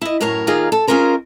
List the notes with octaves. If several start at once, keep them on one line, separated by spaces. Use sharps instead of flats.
E4 D#5
F#2 A2 A#4 C#5 A#5
D#2 D#4 F4 G#4 A#4
A4
C#4 D#4 F4 G#4 A#4 C5